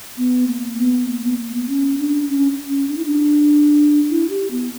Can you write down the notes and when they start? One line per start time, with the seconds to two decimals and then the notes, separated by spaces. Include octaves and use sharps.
0.17 B3
0.47 A#3
0.79 B3
1.08 A#3
1.23 B3
1.38 A#3
1.54 B3
1.68 C#4
1.98 D4
2.28 C#4
2.69 C#4
2.89 D4
2.97 E4
3.05 D4
4.10 E4
4.30 G4
4.51 B3